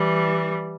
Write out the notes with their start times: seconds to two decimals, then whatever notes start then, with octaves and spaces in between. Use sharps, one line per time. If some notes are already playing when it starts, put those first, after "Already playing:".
Already playing: E3 G3